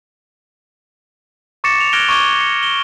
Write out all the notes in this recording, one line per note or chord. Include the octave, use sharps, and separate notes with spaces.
C#6 D6 A6 A#6 C#7 E7
F7
F6 F#6 G#6 A#6 D7 G7
C#6 D6 G#6 G7
C#7
G7